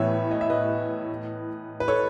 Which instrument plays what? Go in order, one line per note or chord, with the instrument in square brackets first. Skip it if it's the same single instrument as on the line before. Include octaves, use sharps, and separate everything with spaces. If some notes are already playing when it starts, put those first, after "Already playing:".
Already playing: [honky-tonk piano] A2 E3 B3 [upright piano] B4 C#5 E5
[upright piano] D#5
E5
B4 D#5
B4
A4 C#5